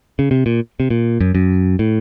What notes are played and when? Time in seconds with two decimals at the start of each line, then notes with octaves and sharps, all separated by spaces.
0.19 C#3
0.31 C3
0.46 A#2
0.80 C3
0.90 A#2
1.20 F#2
1.35 F#2
1.79 A2